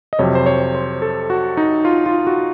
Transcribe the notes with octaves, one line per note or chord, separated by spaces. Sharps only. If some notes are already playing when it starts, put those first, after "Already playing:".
D#5
F2 C3 F#3 C#5
C5
C#5
C5
A4
F#4
D#4
F4
F4
F#4